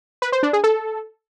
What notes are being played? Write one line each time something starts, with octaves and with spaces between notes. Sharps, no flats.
B4
C5
D4
G#4
A4